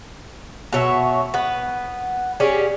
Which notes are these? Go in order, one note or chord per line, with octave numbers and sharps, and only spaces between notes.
B2 F#3 C#5 E5
B3 B4
C#4 G4 G#4 D5